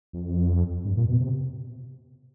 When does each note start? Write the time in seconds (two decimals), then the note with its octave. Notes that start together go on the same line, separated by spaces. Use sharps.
0.13 F2
0.85 G2
0.97 A#2
1.08 B2
1.20 C3